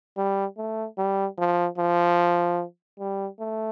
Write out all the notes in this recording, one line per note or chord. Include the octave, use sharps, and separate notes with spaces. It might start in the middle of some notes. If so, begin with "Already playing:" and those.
G3
A3
G3
F3
F3
G3
A3